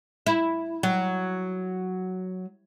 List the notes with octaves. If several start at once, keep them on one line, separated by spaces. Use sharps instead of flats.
E4
F#3